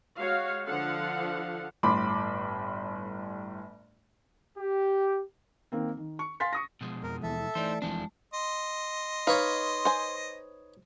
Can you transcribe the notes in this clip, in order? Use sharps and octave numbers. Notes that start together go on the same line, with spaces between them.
G#3 F#4 C#5 F5
D3 F3 A4 F5 F#5
G1 A2 B5 C6 D6
G4
D#3 A#3 C4
D#3
C#6
F5 G#5 C6 A6 B6
C#6 D#6 A#6
B2 F3 G#3
F2 A#4
D#2 E3 A4 E5
E3 A3 D#4 C5 D5
E1 F2 E3 F3 G#3 C4 D4 A5
D#5 C6
D#4 B4 C#5 F5
C5 G#5